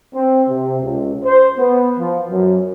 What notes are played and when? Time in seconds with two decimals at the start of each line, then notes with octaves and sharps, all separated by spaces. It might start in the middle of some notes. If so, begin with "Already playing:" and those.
0.14 C4
0.49 C3
0.82 C#2
1.25 C5
1.58 B3
1.98 F3
2.30 F#2